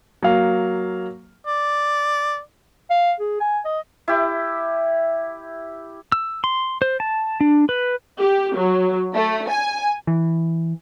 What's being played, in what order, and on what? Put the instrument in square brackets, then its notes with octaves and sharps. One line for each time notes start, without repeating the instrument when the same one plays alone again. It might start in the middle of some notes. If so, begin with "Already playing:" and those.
[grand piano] F#3 A#3 F5
[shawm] D5
[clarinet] F5
G#4
G#5
D#5
[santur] E4 G4
[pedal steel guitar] E6
C6
C5
A5
D4
B4
[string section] G4
F#3
A3
G#5
[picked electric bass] E3